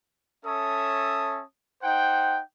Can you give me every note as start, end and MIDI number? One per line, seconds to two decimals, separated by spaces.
0.45 1.42 61
0.45 1.42 69
0.45 1.42 73
0.45 1.42 76
0.45 1.42 81
0.45 1.42 87
1.82 2.40 63
1.82 2.40 72
1.82 2.40 78
1.82 2.40 79